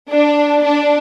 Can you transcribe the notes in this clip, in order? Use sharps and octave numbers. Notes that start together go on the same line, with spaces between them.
D4
D4